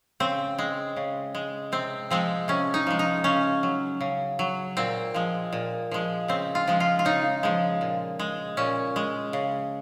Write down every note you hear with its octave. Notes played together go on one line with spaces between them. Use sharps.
C#3 C4
G#3
C#3
G#3
C3 C4
F3 G#3 C4
C3 C#4
D#4
F3 G#3
D#4
C#3 C#4
F#3
C#3
F#3
A#2 C4
F3 G#3
A#2
F3 G#3
C#3 C4
F4
F3 G#3
F4
F4
C#3 D#4
F3 G#3
A#2
G#3
A#2 C#4
G#3
C#3